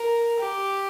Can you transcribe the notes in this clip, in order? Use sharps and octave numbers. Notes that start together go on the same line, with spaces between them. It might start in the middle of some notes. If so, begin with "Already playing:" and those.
Already playing: A#4
G4